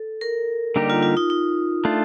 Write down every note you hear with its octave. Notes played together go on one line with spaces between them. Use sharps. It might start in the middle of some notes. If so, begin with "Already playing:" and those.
Already playing: A4
A#4
D3 G3 A#3 D#4 G4
F4
F4
D#4
D#4
A3 D4 F4